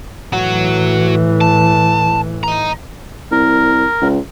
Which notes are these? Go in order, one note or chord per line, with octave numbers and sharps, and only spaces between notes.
A2 E3 F#3 F#4
A5
D#5 A#5
C2 A#4
C#2